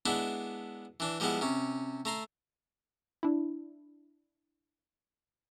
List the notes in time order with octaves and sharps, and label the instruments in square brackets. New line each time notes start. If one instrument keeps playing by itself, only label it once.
[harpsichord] G#3 B3 D4 E4
E3 D4
F3 G3 G#3 B3 E4
C3 C#4
A3 A#5 C6
[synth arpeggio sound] D4 E4